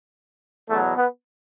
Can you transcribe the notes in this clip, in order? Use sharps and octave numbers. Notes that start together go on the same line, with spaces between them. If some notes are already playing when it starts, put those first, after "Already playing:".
E2 B2 F#3 A3
B3